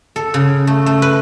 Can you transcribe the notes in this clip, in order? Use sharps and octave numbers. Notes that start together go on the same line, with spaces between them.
A4
C#3
A3
A3
B4